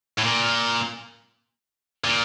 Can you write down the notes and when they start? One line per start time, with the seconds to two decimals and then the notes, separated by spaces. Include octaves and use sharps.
0.18 A2
0.23 A#2
2.04 A#2